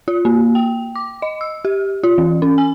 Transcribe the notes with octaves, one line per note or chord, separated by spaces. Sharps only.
F4
A#3
G5
D6
D#5
E6
G4
F4
E3
C#4
G#5